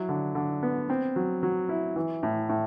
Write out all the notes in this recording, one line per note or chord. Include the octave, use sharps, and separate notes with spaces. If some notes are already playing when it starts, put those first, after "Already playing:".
Already playing: F#3 E4
D3
D3
B3
C4
F#3
F#3
E4
E3
A2
A2